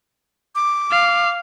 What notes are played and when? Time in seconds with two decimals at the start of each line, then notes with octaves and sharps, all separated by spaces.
0.55 D6
0.91 F5